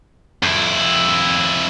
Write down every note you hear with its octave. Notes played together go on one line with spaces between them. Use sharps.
F2 E4